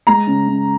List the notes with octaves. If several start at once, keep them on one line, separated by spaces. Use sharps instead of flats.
G#3 A#5
C#3
C#3